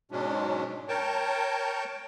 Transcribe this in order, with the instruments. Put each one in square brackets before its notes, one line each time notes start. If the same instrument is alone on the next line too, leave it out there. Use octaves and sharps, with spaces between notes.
[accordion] G#2 B2 F#3 G#3 C#4 D4
A#4 C#5 G5 A5